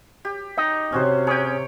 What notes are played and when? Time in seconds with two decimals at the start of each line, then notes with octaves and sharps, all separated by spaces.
0.25 G4
0.57 D#4 D#5 G5 A#5
0.92 C3 C#4 F#4 C5
1.27 C#4 G#4 C#5 G5